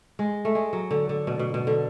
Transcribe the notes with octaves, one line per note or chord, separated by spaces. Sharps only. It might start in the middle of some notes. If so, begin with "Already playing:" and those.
G#3
A3
G#3
F#3
D3
D3
B2
B2
B2
D3